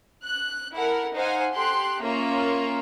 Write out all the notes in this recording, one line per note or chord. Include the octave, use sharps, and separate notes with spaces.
F#6
E4 A4 A#4 F#5
D#4 C5 F5 F#5 G#5
G4 A4 C6 F#6
A#3 C#4 F4 E5 A#5